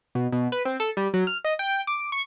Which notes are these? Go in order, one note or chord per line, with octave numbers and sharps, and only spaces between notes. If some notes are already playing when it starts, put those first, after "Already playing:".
B2
B2
B4
C4
A4
G3
F#3
F6
D#5
G5
D6
C#6